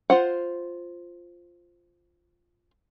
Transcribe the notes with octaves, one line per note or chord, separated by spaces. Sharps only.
F4 C5 F#5